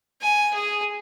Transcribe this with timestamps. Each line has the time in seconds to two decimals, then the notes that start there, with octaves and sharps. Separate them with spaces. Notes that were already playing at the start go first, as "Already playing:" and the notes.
0.22 G#5
0.54 G#4